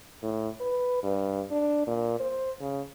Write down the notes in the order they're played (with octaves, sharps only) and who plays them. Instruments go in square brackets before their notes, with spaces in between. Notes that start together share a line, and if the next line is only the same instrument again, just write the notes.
[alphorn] A2
B4
G2
D4
A#2
C5
C#3